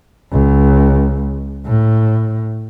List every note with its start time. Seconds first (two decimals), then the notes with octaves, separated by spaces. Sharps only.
0.32 C#2
1.66 A2